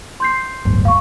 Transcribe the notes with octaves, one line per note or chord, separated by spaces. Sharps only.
C6 G6 C7
D1 G1
F5 C#6